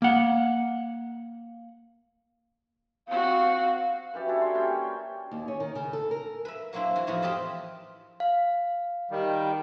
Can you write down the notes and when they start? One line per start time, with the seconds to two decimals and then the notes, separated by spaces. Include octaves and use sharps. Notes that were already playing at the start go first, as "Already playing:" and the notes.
0.02 A#3 F#5
3.08 C4 F#4 F5
4.14 F#2 E3 G4 D5
4.28 D4 E4 A4
4.41 C#5 C6
4.54 G3 A#3 C#4 G5
5.31 D#2
5.48 C#4
5.60 D#3
5.75 C#3
5.93 A4
6.11 A#4
6.45 B4 E5
6.73 F#3 A#3 C4 D4 E4 B4
6.96 E3 F#4 G#5
7.07 F2 A2 E3 F3 B3 F#4
7.22 C4 G4 A#4 D#5 A5 B5
8.20 F5
9.11 D#3 G3